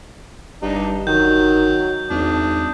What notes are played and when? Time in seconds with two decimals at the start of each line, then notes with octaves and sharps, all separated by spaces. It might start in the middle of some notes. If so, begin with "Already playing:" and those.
0.62 G1 G2 D4 D#4
1.07 D#3 F#3 G6
2.10 G#1 E2 D4 D#6